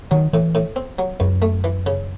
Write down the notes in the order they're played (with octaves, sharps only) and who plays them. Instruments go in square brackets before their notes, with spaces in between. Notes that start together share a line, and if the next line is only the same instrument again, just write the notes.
[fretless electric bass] D#3 [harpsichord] F#3
[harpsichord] A2 [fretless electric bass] E3
[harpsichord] A2
C4
F#3
[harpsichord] C#2 [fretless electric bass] F#2
[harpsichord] A3
E3
C#3